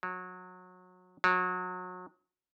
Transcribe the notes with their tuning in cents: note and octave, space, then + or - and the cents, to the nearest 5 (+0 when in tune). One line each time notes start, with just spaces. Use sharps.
F#3 -25
F#3 -30